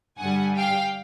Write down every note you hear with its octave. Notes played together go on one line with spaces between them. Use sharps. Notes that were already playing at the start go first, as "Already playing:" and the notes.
G2 D3 G3 F#5 G#5
F5 G5